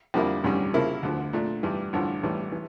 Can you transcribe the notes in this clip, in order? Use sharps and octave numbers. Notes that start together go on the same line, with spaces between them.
F2 D3 G3 A#3 E4
A1 G2 D3 G3 C#4
C#3 F3 A#3 E4 A#4
D2 D3 F3
A#2 A3 D4
G2 E3 G3
A1 G2 D3 F3
A1 A2 E3 G3
E3